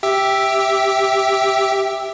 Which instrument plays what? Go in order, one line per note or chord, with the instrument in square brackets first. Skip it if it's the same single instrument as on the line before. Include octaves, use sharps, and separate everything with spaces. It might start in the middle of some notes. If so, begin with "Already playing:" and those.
[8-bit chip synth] G4 E5